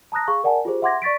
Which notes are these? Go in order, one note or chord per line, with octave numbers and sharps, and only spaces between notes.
A5 A#5 D#6 F#6 A#6
G#4 F5 C#6
A#4 D5 F#5 G#5 A5
F4 G4 G#4 C5
E5 F#5 C6 D6 G#6 A#6
D5 C#6 A6 B6 D7